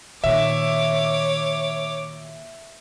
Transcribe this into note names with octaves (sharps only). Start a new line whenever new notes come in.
A#2 D#3 C#5 E5 D6